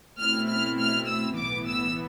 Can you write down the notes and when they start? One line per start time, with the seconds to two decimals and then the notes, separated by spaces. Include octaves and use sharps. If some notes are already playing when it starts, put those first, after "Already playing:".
0.19 B2 A3 C4 E4 F6
0.49 F6
0.79 F6
1.08 E6
1.37 B1 A2 E3 B3 D6
1.67 E6